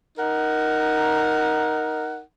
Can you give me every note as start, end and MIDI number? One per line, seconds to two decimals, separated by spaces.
0.18 2.20 63
0.18 2.20 70
0.18 2.20 78